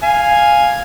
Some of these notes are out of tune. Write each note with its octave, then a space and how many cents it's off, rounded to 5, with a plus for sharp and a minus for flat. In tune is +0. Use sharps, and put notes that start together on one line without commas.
F5 +0 G#5 +0